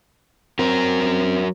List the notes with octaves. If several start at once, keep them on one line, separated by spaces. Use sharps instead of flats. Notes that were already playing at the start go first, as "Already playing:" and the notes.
F#3 C4 A#4